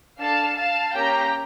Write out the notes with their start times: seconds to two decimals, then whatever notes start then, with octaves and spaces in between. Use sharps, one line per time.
0.21 D4 A4 F5 A5
0.58 F5 A5
0.94 A#3 C#4 G4 G5 A#5